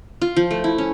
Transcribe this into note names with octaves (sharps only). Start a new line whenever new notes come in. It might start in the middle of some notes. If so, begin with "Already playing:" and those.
F4
F3
A3
E4
C#4